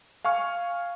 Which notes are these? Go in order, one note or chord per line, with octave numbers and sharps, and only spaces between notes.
F5 G#5 C#6 F6